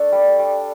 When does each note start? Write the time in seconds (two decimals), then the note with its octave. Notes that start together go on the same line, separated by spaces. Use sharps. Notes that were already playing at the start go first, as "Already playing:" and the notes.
Already playing: A3 D4 A4
0.12 G3
0.39 G3